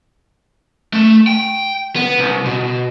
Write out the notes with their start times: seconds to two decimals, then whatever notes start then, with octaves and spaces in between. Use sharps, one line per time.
0.93 A3
1.27 G5
1.96 B3
2.19 C2
2.46 B2